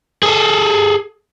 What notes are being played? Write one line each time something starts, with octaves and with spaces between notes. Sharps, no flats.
G#4 A4